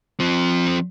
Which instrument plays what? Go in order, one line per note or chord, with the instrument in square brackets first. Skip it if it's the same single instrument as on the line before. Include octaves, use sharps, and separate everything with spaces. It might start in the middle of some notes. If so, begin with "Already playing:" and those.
[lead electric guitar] F3 C4